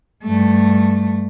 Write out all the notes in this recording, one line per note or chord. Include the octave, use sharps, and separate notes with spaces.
G2 A3